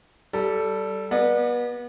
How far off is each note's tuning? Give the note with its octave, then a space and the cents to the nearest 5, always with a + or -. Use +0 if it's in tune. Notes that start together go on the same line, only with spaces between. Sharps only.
G3 -15 A4 +0
B3 -30 D5 +35